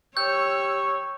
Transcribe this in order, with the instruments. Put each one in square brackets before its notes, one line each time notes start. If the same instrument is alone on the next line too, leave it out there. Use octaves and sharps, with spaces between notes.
[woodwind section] G4 C#6 E6 [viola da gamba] C#5 [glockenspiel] G6